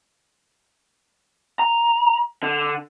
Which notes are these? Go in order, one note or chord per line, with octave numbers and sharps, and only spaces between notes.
A#5
D3